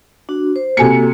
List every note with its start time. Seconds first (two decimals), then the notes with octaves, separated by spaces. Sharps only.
0.29 D4 F#4
0.56 C5
0.77 C3 A#3 F#4 A4 G#5 C#7